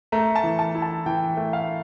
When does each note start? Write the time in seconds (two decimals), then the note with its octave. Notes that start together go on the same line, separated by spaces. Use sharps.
0.12 A3 A#5
0.36 A5
0.44 E3
0.59 A5
0.75 E4
0.82 A5
1.06 E3 G5
1.37 A3
1.53 F5